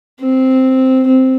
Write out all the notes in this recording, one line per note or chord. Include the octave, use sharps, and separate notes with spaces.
C4
C4